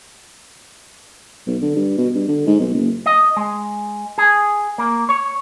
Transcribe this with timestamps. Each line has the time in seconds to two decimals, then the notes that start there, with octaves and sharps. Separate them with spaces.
1.47 B1
1.62 D3
1.76 G2
1.98 B2
2.15 G2
2.28 D3
2.47 G#2
2.60 B1
2.74 F#1
3.06 D#5
3.37 G#3
4.18 G#4
4.78 A#3
5.09 C#5